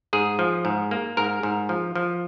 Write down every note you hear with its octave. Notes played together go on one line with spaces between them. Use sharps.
G#2 G#4
F3
G#2
A#3
G#2 A#4
G#2
F3
F3